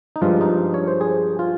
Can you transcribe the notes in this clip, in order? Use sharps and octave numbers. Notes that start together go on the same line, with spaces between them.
D#4
G2 F3 G#3 F4
D#4
C#5
C5
G#4
F4